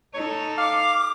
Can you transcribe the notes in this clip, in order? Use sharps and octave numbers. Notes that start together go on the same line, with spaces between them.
D#4 A4 C#5
F5 D6